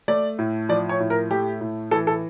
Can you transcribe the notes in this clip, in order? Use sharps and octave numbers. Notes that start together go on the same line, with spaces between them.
A3 D5
A2
F3 D5
C#5
A2
A#4
A3 G4
A2
E3 A4
A4